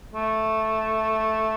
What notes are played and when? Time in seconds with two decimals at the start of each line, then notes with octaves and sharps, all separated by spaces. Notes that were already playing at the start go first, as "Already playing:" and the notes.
0.14 A3